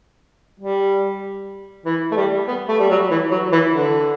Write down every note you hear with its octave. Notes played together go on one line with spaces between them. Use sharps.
G3
E3
A3
G3
B3
A3
G3
F#3
E3
F#3
E3
D3